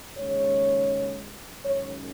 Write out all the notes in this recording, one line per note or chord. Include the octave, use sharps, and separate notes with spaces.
D#2 C#3 G#3 C#4 C#5
F#2 D#3 G#3 C#4 C#5